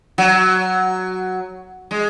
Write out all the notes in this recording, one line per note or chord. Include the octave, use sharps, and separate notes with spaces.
F#3
G#3